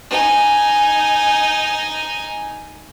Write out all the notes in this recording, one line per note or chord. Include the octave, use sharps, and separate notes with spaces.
D#4 G#5